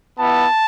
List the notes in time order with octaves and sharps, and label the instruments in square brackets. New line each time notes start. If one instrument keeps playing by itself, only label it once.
[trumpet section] B3 E4 A5